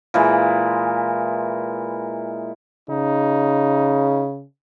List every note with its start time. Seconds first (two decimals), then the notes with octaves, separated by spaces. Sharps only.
0.14 A#2 E3 G#3
2.90 C#3 D#4